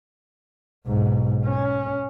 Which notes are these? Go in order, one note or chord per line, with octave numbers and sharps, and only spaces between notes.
B1 G#2
C#4